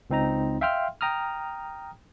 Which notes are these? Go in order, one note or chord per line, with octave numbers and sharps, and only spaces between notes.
C#2 C4 D#4 A#5
E5 F5 G5 C6 F6
G5 A#5 D#6 F6